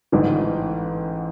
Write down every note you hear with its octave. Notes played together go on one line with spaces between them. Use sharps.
A1 G#2 E3